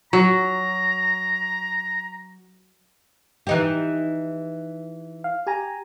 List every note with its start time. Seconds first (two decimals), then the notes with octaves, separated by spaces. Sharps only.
0.13 F#3 A#5
3.47 E3 D#4 G4
5.24 F5
5.47 G4 G#5 A#5